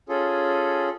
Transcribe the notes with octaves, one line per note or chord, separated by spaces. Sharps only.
C#4 F4 G#4 A4